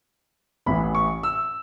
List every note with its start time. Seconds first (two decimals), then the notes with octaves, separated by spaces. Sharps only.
0.66 A1 A2 E3 B5
0.95 C#6
1.23 E6